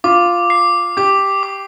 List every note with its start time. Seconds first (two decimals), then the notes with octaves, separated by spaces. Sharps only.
0.04 F4 D6
0.50 C7
0.97 G4 D6
1.43 D6